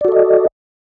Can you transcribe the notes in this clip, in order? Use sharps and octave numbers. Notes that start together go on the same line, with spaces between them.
F#4 A4 D5 D#5